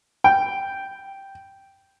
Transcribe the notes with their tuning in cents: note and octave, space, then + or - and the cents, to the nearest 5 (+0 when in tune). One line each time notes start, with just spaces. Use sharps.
G5 -5